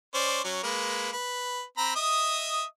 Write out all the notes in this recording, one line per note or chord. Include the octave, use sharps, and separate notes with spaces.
C#4 C5 D5
F#3 C#4
G#3 A#3 B4
B4
C4 A#5 B5
D#5 E5 D#6